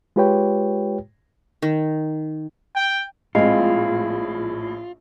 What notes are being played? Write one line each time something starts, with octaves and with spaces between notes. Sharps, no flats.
G#3 F4 G4 B4 C#5 G5
D#3
G5
A#1 A2 G#3 C4 F4